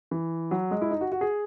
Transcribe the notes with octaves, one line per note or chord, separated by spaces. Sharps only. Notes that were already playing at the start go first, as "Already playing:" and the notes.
E3
F#3
G#3
E4
D#4
F#4
F#4
G#4